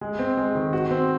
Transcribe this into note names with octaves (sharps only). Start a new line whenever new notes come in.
G#3
C4
G#3
D#3
F#4
C4